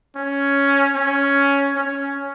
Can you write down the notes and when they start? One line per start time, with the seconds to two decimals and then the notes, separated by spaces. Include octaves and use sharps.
0.16 C#4
0.96 C#4
1.75 C#4